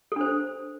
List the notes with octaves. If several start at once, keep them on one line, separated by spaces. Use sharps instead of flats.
D4 A4 C5